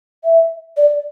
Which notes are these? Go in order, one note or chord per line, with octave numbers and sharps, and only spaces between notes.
E5
D5